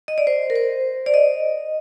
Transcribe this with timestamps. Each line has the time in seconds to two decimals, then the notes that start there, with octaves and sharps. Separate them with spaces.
0.08 D#5
0.18 D5
0.27 C5
0.50 A#4
0.55 C5
1.06 D5
1.14 D#5